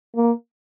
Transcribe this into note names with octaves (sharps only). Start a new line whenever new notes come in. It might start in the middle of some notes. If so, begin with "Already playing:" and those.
A#3